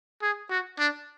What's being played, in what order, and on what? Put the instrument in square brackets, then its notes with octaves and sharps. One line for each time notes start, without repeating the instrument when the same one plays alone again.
[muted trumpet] G#4
F#4
D4